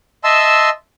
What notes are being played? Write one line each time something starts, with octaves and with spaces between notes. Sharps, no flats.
D#5 E5 A5 C6 E6